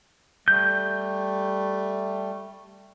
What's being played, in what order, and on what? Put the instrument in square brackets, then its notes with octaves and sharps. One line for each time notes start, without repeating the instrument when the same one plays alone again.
[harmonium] G3 A3 [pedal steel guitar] G6